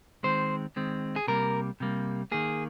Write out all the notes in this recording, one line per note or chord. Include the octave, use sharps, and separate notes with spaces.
D#3 G#3 C4 C5
D#3 G#3 C4
G#4
C3 G3 A#3 A#4
C3 G3 A#3
D#3 A#3 G#4